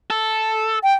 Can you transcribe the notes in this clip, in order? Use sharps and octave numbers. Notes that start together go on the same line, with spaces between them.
A4
G5